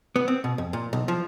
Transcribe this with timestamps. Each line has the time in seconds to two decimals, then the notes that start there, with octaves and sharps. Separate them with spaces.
0.16 B3
0.28 C4
0.44 B2
0.58 F2
0.73 A#2
0.93 B1
1.08 F3